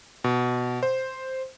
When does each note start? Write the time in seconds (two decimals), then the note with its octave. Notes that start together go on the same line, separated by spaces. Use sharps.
0.24 B2
0.83 C5